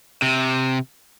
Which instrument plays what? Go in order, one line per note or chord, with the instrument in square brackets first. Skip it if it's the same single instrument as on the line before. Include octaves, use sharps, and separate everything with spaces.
[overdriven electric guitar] C3